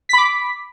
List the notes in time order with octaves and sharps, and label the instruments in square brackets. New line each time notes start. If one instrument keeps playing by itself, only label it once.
[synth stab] B6
B5
D6